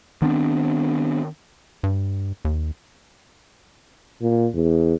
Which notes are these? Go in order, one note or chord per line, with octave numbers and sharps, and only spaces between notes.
D#3 B3 C4 D4
G2
D#2
A#2
E2